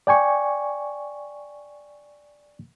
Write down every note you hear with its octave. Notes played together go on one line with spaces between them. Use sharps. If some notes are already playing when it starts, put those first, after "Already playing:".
D5 G5 G#5 C#6